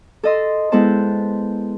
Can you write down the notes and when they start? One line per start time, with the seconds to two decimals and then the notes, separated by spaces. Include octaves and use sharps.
0.23 A4 D#5 C6
0.72 G#3 B3 E4 A4 C5 A5